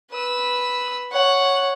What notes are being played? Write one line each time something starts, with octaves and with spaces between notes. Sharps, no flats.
B4 E6
C#5 F#5